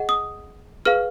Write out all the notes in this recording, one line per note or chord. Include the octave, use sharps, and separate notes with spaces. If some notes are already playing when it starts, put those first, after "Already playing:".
Already playing: G#4 D#5 F#5
D#6
G#4 B4 F5 F6